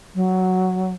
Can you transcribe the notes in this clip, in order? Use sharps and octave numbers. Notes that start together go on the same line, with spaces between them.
F#3